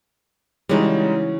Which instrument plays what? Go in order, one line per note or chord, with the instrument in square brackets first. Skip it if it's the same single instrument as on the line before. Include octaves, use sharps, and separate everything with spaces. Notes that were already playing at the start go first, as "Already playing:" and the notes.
[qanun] C#3 E3 F#4 [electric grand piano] G3 G#3 D#4